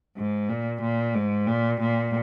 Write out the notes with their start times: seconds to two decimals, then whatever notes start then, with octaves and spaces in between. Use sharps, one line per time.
0.17 G#2
0.49 A#2
0.81 A#2
1.15 G#2
1.47 A#2
1.81 A#2